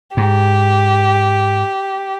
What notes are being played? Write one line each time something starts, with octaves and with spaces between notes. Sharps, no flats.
G#2 G4